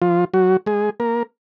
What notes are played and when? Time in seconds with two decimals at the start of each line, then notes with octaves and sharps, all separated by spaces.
0.02 F3 F4
0.34 F#3 F#4
0.66 G#3 G#4
1.00 A#3 A#4